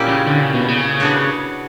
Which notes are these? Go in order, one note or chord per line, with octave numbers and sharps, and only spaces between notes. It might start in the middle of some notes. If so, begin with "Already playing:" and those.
Already playing: A#2 A#3 C#4 E4 G4
C#3
D3
C#3
B2
C#3
B3 D4 F#4 C#5